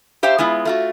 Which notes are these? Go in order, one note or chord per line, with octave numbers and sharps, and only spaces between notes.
G4 C5 E5 F5 G5
G#3 B3 E4 F4
A3 F4 F#4